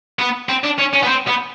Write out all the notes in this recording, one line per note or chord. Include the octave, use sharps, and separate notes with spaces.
B3
C4
D4
C#4
C#4
B3
C4
B3